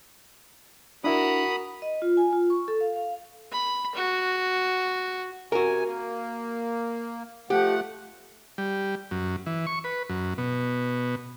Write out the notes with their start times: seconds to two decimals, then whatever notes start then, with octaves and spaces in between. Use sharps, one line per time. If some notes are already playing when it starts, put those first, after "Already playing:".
1.04 D4 E4 F#4 A#4 B5 D#6
1.82 D#5
2.02 F4
2.17 G#5
2.33 F4
2.50 C#6
2.68 A4
2.81 F5
2.96 F5
3.52 B5
3.95 F#4
5.52 C3 F#4 A#4 G#5
5.86 A#3
7.50 F3 A3 G4 F#5
8.58 G3
9.11 F#2
9.46 E3
9.67 C#6
9.84 B4
10.09 F#2
10.38 B2